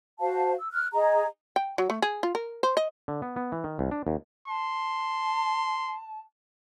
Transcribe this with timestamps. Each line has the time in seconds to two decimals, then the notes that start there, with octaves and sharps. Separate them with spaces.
0.20 F#4 C5 F5 A5
0.59 E6
0.72 F6 F#6
0.93 G#4 D#5 A#5
1.56 G5
1.78 F#3
1.90 A3
2.02 G#4
2.23 F4
2.35 A#4
2.63 C5
2.77 D#5
3.08 D3
3.22 B3
3.36 B3
3.52 E3
3.64 D#3
3.79 C2
3.91 D4
4.07 D#2
4.48 A5 C6